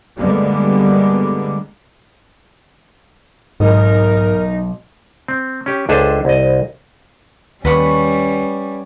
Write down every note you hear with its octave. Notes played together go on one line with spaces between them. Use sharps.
D3 G3 G#3 A#3 B3
B1 G#2 D#4 A#4 D#5
C4
C#4 G4
C#2 D4 G#4 A4 C5 E5
C2 D#5
D#2 G3 C#4 B4 F#5 C#6